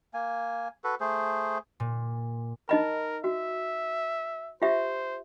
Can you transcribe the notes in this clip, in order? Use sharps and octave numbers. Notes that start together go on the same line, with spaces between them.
A#3 G#5
F#4 A4 B4
A3 G#4 C5
A#2
D#4 A#4 D#5 B5
F#4 E5
F4 G4 C5 E5